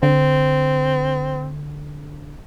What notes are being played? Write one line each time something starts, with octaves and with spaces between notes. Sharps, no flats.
D3 C4